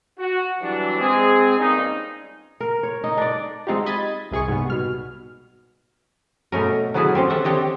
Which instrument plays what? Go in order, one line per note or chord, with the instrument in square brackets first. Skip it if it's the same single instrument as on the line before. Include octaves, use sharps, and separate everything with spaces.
[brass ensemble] F#4
E3 F#3 G3 D4
G#3 C4 G#4
G2 A#2 G3 C#4 D#4
[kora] A#4
C#5
D#4
D4 D5
[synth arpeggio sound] G#3 C4 D#4 F4 G4
D#5 B5 G#6 A6
C2 C3 G#4 G#5 C#6
G#2 C3 G3 B3
B2 F6
[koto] B2 A3 C#4 A#4
F#3 B3 C#4 E4 G#4 A4
C4 C#4 G4
A4 E5 F#5
C4 D4 G4 C#5 D#5